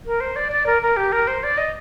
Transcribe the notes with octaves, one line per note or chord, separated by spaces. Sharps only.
A#4
C5
D5
D5
A#4
A#4
G4
A#4
C5
D5
D#5